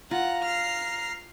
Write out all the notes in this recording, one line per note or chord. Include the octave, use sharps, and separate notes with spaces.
F4 F#5 A#5
F6 C7